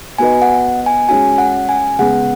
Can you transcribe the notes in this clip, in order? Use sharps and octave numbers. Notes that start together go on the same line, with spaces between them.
B3 F#4 B4 D#5 G#5
F#5
G#5
G#3 C#4 F#4 G#5
F#5
G#5
C#3 G#3 B3 F#5